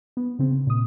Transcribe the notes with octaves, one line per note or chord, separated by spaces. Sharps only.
B3
C#3 C4
A#2 D#6